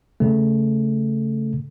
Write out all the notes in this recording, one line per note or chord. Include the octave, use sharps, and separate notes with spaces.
C#3 A3